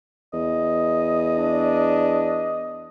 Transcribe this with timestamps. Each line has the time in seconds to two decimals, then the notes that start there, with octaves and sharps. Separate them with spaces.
0.33 E2 D#5
1.38 D4